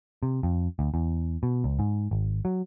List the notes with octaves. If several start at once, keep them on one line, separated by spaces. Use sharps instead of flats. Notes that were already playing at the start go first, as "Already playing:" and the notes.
C3
F2
D2
E2
B2
C#2
G#2
G#1
F#3